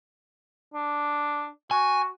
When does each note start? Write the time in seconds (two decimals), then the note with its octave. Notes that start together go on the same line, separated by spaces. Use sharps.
0.74 D4
1.71 F#4 G#5